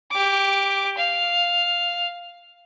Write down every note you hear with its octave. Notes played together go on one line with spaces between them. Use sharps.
G4 D6
F5